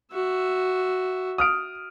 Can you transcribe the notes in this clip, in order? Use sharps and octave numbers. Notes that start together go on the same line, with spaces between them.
F#4 E5
D#6 F6 D7